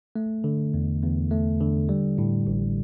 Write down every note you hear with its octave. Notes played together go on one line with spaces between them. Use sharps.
A3
D3
E2
E2
A3
D3
G3
A2
A1